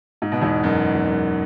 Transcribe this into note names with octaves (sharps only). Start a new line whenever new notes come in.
G#2
B2
E2 G#2
F#2
E2
F#2